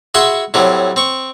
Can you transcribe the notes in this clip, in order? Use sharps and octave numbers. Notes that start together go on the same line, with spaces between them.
F#4 G#4 E5 F#5 B5 C6
A2 F#3 G3 C4
C4 C#6